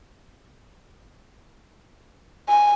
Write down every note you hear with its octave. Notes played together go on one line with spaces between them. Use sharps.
G#5